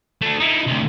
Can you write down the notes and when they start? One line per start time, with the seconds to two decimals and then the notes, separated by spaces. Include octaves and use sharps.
0.21 A3 D4
0.40 D#4 E4
0.67 D2 C3